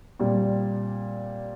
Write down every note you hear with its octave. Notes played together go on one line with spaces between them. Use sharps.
A#2 G3 C4